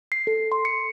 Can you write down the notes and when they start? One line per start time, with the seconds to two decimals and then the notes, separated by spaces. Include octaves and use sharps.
0.12 C7
0.27 A4
0.52 C6
0.65 C#7